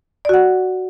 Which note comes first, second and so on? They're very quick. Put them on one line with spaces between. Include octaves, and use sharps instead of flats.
D5 F#4 F#5